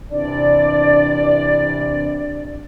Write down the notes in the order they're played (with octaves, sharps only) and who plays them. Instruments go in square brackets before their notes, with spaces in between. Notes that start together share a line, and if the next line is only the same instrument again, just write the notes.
[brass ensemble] C3 E3 D4 [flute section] D5